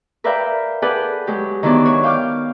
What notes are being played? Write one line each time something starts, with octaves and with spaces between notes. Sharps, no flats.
A#4 B4 D5 E5 F5 G5
G#4 A4 B4 D5 F#5 G5
F#3 G#3 G4
D#3 E3 F#3 B3 D4 D5
F#4 C#5
F5 G5 D6 F6